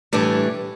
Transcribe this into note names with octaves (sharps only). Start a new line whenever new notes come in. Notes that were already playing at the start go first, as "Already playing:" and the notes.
A2 E3 G3 D4